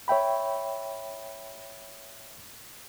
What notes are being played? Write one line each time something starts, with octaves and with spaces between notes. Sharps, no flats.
C#5 E5 G5 B5